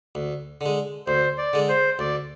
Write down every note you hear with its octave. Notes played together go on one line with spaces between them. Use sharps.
D2
D3 G#3
D2 C5
D5
D3 G#3
C5
D2 D5